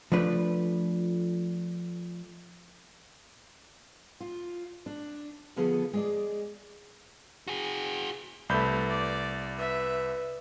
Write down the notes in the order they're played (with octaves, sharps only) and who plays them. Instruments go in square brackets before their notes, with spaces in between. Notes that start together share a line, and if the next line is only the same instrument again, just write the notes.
[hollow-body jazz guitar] F3 A3 D4 B4
[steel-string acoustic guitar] F4
D4
D3 F3 B3 G#4 A4
G#3 G#4 D5
[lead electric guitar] F#4 G#4
[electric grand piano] C2 B5 G6 [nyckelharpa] A3 B4
[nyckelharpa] D5
B4 E5